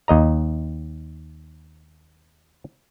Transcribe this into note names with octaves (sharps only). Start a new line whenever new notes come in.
D#2 D#5 A#5